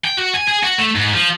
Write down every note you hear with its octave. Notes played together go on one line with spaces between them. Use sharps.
G5
F#4
G#5
G#4
F#4
A3
G#2
F3